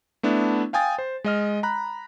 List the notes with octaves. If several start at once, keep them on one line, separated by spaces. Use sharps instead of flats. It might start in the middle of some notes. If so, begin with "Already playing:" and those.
A3 B3 D4 E4
F5 G5 G#5 D#6 A6
C5
G#3 D#5 F6
A#5 B5 F#6